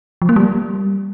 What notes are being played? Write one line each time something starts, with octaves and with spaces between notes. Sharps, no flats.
F3
A#3
G3